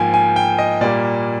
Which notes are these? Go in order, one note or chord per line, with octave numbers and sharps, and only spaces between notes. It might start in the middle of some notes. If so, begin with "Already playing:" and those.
Already playing: G#2 F3 A#3 G5 G#5
G#5
G5
D#5
A#2 G3 A#3 D5